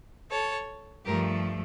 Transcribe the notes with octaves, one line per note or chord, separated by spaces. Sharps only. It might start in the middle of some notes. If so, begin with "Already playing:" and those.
A4 C#5
G2 F3 A3 G4 A#4